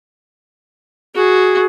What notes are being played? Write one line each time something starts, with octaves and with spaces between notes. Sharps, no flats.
F#4 G#4